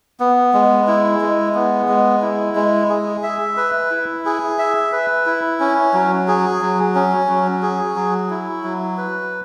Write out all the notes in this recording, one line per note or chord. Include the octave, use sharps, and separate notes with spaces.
B3
G#3
E4
G#3
B3
G#3
E4
G#3
G#4
E5
B4
E4
G#4
E5
B4
E4
C#4
F#3
G#4
F#3
C#4
F#3
G#4
F#3
E4
F#3
B4